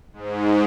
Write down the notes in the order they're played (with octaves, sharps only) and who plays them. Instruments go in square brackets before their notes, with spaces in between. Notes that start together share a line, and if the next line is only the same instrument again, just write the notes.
[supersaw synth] G#2